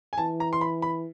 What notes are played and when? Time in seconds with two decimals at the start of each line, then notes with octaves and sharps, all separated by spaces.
0.13 G#5
0.18 E3 A5
0.40 A#5
0.53 C6
0.61 B5
0.82 B5